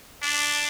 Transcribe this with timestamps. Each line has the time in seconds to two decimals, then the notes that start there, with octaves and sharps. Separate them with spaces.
0.22 D4